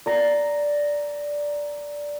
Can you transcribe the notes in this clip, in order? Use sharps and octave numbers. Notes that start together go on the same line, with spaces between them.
D5 A#5